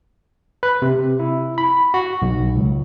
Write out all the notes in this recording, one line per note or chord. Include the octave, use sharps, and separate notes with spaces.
B4
C3
E4
B5
F#4
B1
C#2